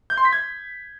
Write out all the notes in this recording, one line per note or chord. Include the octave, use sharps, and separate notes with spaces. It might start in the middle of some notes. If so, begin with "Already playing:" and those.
G6
C6
B6
G#6